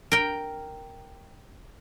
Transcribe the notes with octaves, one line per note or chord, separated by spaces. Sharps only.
A#4 G5